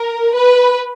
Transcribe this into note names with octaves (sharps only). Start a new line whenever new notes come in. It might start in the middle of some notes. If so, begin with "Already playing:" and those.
Already playing: A#4
B4